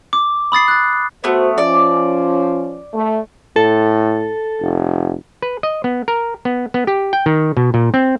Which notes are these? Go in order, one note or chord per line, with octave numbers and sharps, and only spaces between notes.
D6
B5 D#6 A6 C7
F#6 A6
A3 B3 F#4 C5
F3 C#4 D5
A3
A2 A4
F1
B4
D#5
B3
A#4
B3
B3
G4
G5
D#3
B2
A#2
C4